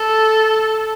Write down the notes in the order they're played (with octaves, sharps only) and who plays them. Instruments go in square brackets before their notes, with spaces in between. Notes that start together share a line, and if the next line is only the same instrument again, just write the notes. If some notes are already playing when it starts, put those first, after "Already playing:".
Already playing: [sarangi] A4